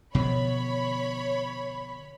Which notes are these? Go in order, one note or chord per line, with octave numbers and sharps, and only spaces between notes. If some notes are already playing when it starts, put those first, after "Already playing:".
B2 D3 F3 C#5 B5